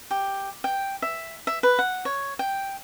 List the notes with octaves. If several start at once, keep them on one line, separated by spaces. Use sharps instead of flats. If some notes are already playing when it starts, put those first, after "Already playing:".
G4
G5
E5
E5
B4
F#5
C#5
G5